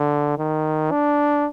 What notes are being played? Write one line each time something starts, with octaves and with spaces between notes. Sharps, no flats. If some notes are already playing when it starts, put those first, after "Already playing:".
Already playing: D3
D#3
D4